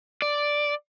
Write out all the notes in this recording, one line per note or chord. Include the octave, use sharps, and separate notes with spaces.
D5